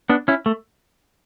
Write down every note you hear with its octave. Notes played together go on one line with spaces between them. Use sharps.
B3 D4
C#4 E4
A3